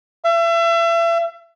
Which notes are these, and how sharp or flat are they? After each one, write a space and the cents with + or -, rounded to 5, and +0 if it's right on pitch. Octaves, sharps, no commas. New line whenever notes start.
E5 +35